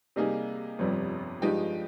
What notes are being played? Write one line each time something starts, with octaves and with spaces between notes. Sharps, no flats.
C3 G3 A#3 D#4 G#4
G1 F2 C3 G3
G2 F3 G#3 D#4 G4